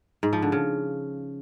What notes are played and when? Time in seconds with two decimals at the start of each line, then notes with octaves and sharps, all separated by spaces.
0.23 G#2
0.33 F3
0.42 D3
0.52 C#3